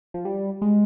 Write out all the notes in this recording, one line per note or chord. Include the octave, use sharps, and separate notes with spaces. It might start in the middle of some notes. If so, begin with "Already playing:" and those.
F3
G3
G#3